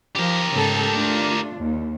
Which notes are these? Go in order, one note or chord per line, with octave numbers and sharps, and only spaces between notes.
F3 G4 A#4
G#2 C#3 A4
A3 D4 F4
D#2